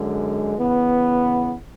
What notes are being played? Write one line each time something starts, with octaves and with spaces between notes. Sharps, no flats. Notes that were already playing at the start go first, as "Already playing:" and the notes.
Already playing: F#2 D3 G#3
C#3 E3 B3